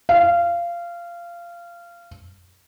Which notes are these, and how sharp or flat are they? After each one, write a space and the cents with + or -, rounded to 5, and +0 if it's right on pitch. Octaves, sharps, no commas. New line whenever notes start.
F5 -20